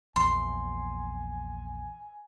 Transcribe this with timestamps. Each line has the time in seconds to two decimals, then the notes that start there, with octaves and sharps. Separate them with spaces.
0.16 A#1 E2 G#5 C6